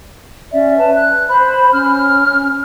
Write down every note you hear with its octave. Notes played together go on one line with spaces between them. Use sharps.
C#4 D5 E5
B4 A5
F#6
C5 B5
C#4 F6